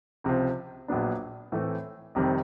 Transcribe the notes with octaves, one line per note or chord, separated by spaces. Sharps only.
C#2 C3 F3
A#1 A#2 F#3 B3 D4
A2 E3 A3 C4
F1 F2 C3 D#3 G3